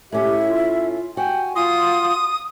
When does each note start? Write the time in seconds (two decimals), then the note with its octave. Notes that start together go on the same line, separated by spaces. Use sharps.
0.12 A2 C#4 G4 E5
0.46 F4
1.17 F#4 G5 G#5
1.56 F4 C6 D#6